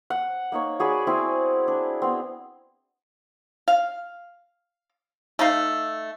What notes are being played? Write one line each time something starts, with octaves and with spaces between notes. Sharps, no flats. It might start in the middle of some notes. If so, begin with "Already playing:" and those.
F#5
A#3 D#4 C#5
F#4 G#4 D5 B5
C4 E4 G#4
D4
B3 C4
F5
A3 D#4 F5